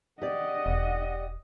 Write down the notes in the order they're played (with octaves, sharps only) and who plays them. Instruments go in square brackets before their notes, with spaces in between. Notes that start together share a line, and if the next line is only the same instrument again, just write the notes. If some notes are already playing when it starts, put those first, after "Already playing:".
[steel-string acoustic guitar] G4 D5 [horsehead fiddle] D#5 F#5
[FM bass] E1